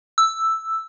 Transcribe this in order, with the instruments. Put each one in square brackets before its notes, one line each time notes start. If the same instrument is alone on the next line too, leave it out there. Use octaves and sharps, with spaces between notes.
[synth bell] E6